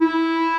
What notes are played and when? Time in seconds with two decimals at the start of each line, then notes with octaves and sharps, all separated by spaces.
0.01 E4